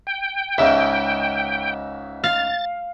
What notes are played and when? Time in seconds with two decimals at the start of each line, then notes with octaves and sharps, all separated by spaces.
0.07 G5
0.58 C#2 G#2 C#3 E5
2.24 F5 A6